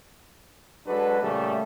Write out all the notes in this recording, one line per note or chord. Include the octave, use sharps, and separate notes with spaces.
F#3 G#3 D4 F#4 A4 B4
A#2 C#3 G3 A3